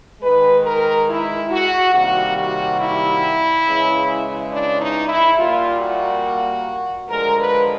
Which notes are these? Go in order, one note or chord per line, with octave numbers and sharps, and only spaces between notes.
D#3 G#3 B4
A#4
E4
F#4
C3 D#3 G3 A#3 F#4
F#4
E4
C#3 E3 G#3
D4
D#4
E4
A#2 G3 A#3 F4
F#4
D3 F3 G#3 A#4
B4